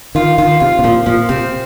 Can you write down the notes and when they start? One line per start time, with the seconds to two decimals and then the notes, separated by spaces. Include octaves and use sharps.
0.15 D#3 F4
0.38 D#3 F4
0.60 C3 F4
0.79 C3
0.84 A#2 F3
1.06 A#2 F3
1.29 C3 C4